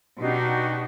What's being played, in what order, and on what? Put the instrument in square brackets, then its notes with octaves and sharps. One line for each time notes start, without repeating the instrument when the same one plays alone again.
[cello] B2 D4 [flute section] D#4 F#4 G4